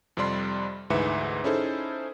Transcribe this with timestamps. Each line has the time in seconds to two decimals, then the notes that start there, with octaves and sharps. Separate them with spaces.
0.17 F2 C3 G3 D5 C6
0.90 D2 G#2 E3 B4 E5 C#7
1.44 C#4 D#4 E4 G#4 A4 C5